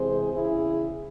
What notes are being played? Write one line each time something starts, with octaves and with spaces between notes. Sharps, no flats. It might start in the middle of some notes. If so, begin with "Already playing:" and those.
Already playing: C3 E3 G#3 C4 G#4 C5
E2 C#3 E4 G#4